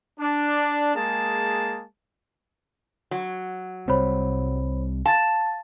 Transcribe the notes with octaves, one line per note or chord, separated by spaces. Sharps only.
D4
G#3 A#3 G#4 A5
F#3
C2 G3 C4 C5 C#5 B5
F5 A5 A6